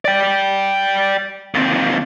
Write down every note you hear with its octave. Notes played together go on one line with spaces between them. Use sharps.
D5 G5
D#2 C4